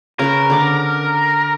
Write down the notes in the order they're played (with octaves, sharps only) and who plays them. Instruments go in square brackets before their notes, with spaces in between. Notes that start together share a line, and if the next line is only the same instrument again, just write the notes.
[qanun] C#3 C#4 B4 [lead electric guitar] A#4
[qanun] D3 D5 D6